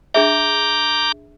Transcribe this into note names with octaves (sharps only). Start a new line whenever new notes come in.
D4 G#4 E5 A#5 D6 G6